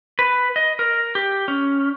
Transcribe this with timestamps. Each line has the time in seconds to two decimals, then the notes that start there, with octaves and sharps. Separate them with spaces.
0.19 B4
0.56 D#5
0.79 A#4
1.15 G4
1.48 C#4